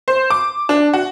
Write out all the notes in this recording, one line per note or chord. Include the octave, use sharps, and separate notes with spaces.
C5
D6
D4
F#4